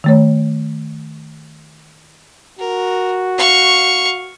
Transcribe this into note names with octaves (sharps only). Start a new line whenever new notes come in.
D#3 A3 C#5
F#4 A#4
F5 C#6